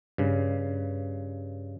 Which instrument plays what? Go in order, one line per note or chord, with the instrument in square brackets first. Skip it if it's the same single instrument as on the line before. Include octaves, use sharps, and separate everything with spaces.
[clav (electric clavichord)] G2 C#3